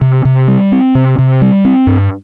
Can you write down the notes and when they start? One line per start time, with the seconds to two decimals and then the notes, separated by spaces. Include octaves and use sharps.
0.01 C3
0.25 C3
0.48 G3
0.72 C4
0.95 C3
1.18 C3
1.42 G3
1.65 C4
1.87 G2